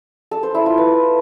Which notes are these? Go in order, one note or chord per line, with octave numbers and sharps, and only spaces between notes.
A4
C5
E4
F4
B4